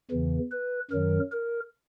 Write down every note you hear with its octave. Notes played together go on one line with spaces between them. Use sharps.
E2 C#3 E3
B4
F#2 D#3 F#3 A#4
A#4